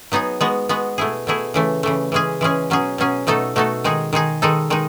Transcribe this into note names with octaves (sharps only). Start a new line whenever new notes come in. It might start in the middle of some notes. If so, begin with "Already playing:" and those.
F#3 B3 D#4 G#4
G#3 B3 F#4
G#3 B3 F#4
B2 A3 E4 G#4
B2 A3 E4 G#4
C#3 E3 A3
C#3 E3 A3
E3 G#3 C#4 G#4
E3 G#3 C#4 G#4
B2 F#3 C#4 G#4
B2 F#3 C#4 G#4
B2 A3 D#4 F#4 A4
B2 A3 D#4 F#4 A4
D#3 G#3 D#4 G#4
D#3 G#3 D#4 G#4
D#3 G#3 D#4 A4
D#3 G#3 D#4